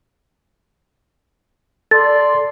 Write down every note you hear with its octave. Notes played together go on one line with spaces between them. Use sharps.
A4 D5 C6 A6